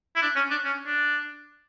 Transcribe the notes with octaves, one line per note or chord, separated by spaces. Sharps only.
E4
D4
C#4
D4
C#4
D4